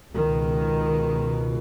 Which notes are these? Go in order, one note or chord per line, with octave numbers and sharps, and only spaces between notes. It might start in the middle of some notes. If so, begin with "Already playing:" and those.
C#2 B2 D#3